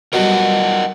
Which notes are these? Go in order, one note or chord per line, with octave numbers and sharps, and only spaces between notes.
B2 F#3 G3 A#4 D#5 F#5